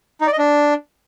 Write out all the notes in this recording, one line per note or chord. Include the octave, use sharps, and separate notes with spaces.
D#4
D5
D#5
D4